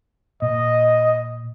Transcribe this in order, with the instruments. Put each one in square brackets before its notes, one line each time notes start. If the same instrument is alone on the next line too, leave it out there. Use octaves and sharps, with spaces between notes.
[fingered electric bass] A#2 [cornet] D#5